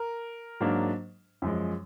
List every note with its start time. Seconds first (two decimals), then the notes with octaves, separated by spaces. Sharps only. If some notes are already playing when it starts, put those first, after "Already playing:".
Already playing: A#4
0.60 G#2 F#3 A#3 D4
1.42 F#2 F3 G#3